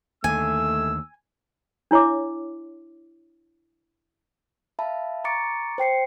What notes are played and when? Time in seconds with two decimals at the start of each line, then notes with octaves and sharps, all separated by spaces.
0.24 D#2 D3 A3 G#5 E6
1.91 D4 E4 C#5 E5 D6
4.79 E5 F5 A5 B5
5.24 A#5 C#6 D6 A6 C#7 D7
5.78 C5 G5 C7 C#7